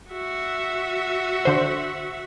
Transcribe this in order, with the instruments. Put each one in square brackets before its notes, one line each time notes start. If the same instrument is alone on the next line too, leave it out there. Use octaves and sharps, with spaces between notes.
[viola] F#4 E5
[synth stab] D3 C5